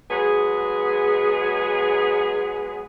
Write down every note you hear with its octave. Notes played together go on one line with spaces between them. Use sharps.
F#3 G#3 B3 G#4